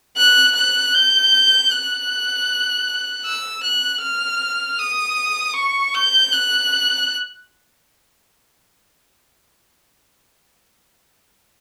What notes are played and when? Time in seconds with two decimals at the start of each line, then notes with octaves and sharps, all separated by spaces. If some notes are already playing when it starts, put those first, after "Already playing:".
0.17 F#6
0.55 F#6
0.94 G6
1.71 F#6
3.25 E6
3.63 F#6
4.02 F6
4.79 D#6
5.56 C#6
5.95 G6
6.33 F#6